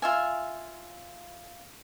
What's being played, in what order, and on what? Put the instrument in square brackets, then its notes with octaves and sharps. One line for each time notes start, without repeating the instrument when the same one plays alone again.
[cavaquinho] F4 E5 G#5